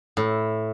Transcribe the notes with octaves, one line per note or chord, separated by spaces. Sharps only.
A2